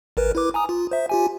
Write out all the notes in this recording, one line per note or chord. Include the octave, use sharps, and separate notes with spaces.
A1 A#4 B4
E4 B4 D6
G#5 A#5 D#6
F4
C5 E5
F4 G4 G#5